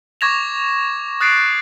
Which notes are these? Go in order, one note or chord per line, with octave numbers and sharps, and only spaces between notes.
C#6 D6 G#6 A#6 E7 F7
D#6 F#6 A6 C7 D7